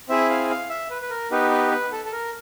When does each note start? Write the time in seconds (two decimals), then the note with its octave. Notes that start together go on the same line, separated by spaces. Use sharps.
0.09 C4 E4 G#4 E5
0.30 F5
0.50 F5
0.69 E5
0.90 B4
1.02 B4
1.10 A#4
1.31 B3 D#4 G4 B4
1.51 B4
1.71 B4
1.92 A4
2.05 A4
2.12 A#4